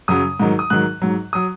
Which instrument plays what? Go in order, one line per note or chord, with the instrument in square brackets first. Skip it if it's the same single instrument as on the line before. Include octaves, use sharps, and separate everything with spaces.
[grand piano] F#2 C#3 F#3 D#6
G#2 D#3 F#3
D#6
G#2 D#3 F#3 F#6
G#2 F#3
F#3 D#6